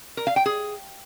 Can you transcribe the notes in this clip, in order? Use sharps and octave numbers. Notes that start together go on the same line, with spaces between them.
A#4
F5
G5
G#4